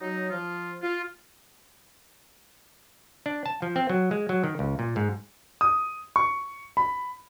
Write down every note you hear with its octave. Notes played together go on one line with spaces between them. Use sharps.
F#3 D#4
F3 F4
F4
D4
A5
F3
C4
F#3
G#3
F#3
D#3
C#2
A#2
G#2
D#6
C#6
B5